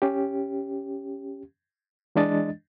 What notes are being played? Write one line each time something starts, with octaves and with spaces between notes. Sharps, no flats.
C#4 G4
E3 G#3 D4 D#5 A6